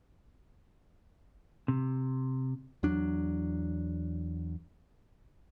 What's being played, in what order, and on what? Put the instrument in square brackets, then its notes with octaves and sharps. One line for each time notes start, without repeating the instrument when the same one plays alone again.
[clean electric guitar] C3
[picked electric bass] E2 F#3 D4